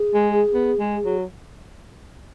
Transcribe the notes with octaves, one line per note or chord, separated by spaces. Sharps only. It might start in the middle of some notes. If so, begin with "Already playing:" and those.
Already playing: G#4
G#3
B3
G#3
F#3